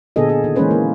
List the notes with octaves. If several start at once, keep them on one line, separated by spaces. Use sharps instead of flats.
A#2 D3 B3 G#4 A4 D#5
G#4
D#3
E3 G#3 A#3 C#4 B4 C5
A#3